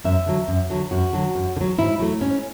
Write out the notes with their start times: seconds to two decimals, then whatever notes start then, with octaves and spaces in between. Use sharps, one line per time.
0.05 F#2 E5
0.26 D3 F#3
0.48 F#2
0.70 D3 F#3
0.91 F#2 F#4
1.13 D3 F#3
1.35 F#2
1.57 D3
1.61 F#3
1.78 G#2 E4
1.99 F#3 A3
2.21 G#2 C#4